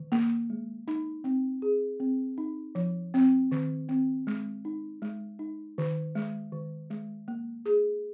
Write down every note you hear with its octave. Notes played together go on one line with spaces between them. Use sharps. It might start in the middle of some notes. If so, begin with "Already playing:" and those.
Already playing: D#3
A#3
G#3
D#4
C4
G#4
C4
D#4
F3
C4
D#3
C4
G#3
D#4
G#3
D#4
D#3
G#3
D#3
G#3
A#3
G#4